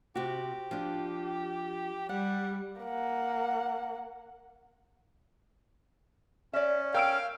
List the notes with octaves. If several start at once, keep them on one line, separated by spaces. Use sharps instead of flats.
C3 F#4 G4
F3 D4
G3 D5 F#5
A#3 F#5
C#4 D5 E5
A#4 F5 G5 E6 D7